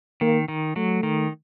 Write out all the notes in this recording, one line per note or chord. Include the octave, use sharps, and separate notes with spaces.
D#3 A#3
D#3
F#3 A3
D#3